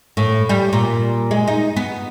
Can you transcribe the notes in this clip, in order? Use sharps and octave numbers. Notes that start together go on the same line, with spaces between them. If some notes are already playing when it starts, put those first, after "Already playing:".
A2
G3
A#2
G#3
D#4
B3